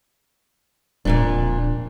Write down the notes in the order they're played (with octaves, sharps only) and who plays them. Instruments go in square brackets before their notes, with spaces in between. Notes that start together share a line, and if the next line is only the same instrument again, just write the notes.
[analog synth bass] D1 [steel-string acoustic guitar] F2 A#2 D4